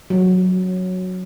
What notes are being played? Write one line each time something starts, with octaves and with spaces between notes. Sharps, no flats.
F#3